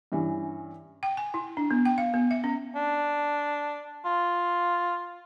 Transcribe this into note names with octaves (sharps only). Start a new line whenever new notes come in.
G2 E3 C#4
G5
G#5
E4
D4
B3
G5
F5
B3
E5
C#4
D4
F4